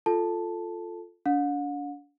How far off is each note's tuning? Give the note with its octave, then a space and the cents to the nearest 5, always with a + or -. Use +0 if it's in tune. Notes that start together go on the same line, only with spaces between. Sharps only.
F4 +0 A4 +0 A5 +0
D4 -35 F#5 -45